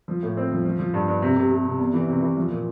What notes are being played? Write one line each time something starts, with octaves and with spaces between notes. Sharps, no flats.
F3
A2
C4
F3
F3
F3
G2
G2
C3
C3
C3
C3
E2
E3
C3
E3
F3
A#2